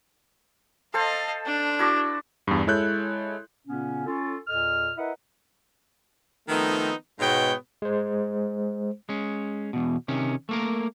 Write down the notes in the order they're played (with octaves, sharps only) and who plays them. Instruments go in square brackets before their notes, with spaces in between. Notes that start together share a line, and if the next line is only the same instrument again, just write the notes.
[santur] A4 C5 A5 [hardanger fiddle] D#5 F5
[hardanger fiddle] D4
[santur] E4 F#4 D5
[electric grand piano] E2 G2
G#3 E4 A4 C#5 F#6 G6
[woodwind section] A#2 C#3 B3 C#4
C#4 F4 A4
E2 A#2 A4 D#5 F6
E4 A#4 B4 D#5 E5 F#5
[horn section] D#3 F3 A3 B3 C4 D#4
G#2 B2 G#3 B3 C#5 G5
[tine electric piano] G#3 C5
[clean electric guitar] G#3 C#4
E2 B2
C3 D#3 C#4
A3 A#3 A#4